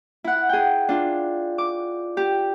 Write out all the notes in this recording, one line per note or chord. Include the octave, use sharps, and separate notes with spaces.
E4 F#5
G#4 G5
D4 F4
D6
G4